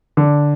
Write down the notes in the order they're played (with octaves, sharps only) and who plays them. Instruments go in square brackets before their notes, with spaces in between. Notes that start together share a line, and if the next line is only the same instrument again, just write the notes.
[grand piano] D3